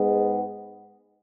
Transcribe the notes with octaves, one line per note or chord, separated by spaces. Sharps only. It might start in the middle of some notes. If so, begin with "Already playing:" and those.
Already playing: G#2 G#3 B3